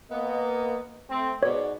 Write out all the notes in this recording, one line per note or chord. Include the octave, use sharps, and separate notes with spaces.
A#3 B3 D#5
A3 C4
G#2 B2 C#5 D5